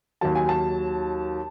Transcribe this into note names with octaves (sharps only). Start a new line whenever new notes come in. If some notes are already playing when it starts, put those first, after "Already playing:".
D#2 D#3 F#3 A5
G#5
A5